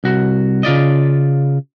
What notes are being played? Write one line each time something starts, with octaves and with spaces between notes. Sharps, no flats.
C2 F#4
C#3 F4 D5 D#5